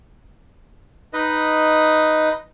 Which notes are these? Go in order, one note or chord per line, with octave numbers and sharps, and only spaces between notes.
D#4 B4 D#5